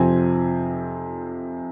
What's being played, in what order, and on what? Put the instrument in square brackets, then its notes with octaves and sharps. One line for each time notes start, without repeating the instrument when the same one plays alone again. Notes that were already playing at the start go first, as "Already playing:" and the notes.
Already playing: [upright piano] F2 C3 F3 C4 G#5